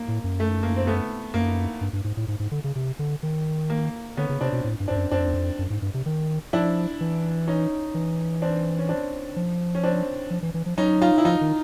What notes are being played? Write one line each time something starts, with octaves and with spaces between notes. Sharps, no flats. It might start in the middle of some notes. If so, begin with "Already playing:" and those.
Already playing: A#3
A2
F#2
A3
A#3
C4
A3 B3
F#2 A#3
G2
G2
G#2
A2
G#2
G#2
D3
C#3
C3
D3
D#3
A#3
D3 B3 C#4
C#3
C3 C4 D4
B2
A2
G2
C4 D4
G2
F#2
F#2 C4 D4
F2
E2
F2
F#2
G#2
G2
C3
D#3
F3 D4 E4
E3
C#4 D#4
E3
C4 D4
C#4
C4 D4
F3
C#4
C4 D4
F3
E3
E3
F3
F#3 C#4 D#4
D#4 F4
E4
F3 D#4 F4
D#3